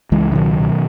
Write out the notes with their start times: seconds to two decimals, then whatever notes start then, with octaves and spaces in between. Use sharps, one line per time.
0.12 C#2 E3 G#3
0.32 E3
0.35 B2 D#3 F#3
0.59 B2